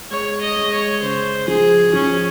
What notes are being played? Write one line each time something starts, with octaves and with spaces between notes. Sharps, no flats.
G#3 C#5
D#5
G#3
C#5
C#3 C5
F3 G#4
F3 C#4